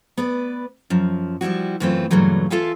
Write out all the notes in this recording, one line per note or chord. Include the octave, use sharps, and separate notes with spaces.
B3 B4 D5
F#2 F3
F3 G3 C4 E4 F#4
F#2 A2 E3 A3 C4 F4
G2 A#2 C#3 E3 F#3 A3
E2 F4 A4 E5 F5 G#5